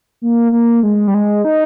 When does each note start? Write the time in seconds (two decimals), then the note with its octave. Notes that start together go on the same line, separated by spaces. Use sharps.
0.22 A#3
0.52 A#3
0.83 G#3
1.08 G3
1.14 G#3
1.45 D#4